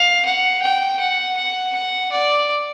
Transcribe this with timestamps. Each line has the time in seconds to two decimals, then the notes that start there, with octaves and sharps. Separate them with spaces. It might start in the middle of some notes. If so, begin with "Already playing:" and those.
Already playing: F5
0.25 F#5
0.62 G5
1.00 F#5
1.37 F#5
1.75 F#5
2.12 D5